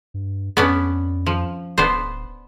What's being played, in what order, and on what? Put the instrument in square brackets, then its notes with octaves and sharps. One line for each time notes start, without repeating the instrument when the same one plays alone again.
[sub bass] G2
[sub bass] F2 [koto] B3 C#4 D4
[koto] F3
[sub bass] D1 [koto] B3 D4 C5